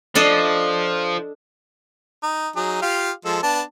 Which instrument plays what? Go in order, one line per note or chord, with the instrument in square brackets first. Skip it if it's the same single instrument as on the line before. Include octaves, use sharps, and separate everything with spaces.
[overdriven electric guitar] F3 [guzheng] D4 A4 D#5
[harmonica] D#4
F#3 D#4 G#4
F4 G4 F5
F3 G#3 A4
B3 D4 A5